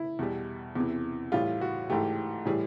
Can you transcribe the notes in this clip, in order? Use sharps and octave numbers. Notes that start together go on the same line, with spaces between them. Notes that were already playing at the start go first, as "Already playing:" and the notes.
Already playing: E4
E2 B2 G3
E2 C3 E3
A2 E3 G3 F4
F#4
G#2 E3 A3 G4
A2 E3 G3 G#4